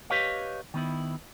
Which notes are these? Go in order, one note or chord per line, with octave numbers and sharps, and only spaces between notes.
G4 B4 C#5 D#5 F5
D#3 B3 E4